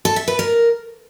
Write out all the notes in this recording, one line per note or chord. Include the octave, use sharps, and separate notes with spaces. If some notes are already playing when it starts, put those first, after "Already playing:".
A4
E5
B4
A#4